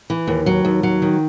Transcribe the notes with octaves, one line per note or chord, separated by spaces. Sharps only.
E3
D#2
F#3
D#2
F#3
D#3